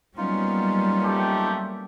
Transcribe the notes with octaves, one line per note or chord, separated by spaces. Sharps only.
F#3 G3 A#3 B3 C#4 D#4 F4
A3 G4